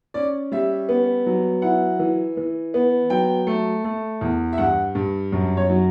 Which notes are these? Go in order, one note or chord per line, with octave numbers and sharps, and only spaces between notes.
C#4 D5
G3 E5
B3
F#3
E4 F#5
E3
E3
B3
F#3 G5
A3
A3
E2
E5
G2 F#5
G2
F#2
C#5
F#3